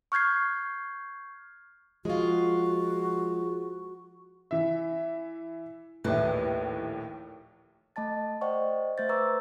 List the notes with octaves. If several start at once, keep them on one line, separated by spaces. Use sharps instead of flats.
C#6 F6 G6 G#6 C7
F3 G#3 F4 F#4
E3 E5
A#1 D#2 A2 E3
A3 D#5 A5 A6
C5 D5 D#5 F#5 G5 C#6
A3 C5 E5 G6 A6
B4 A#5 C#6 D6 E6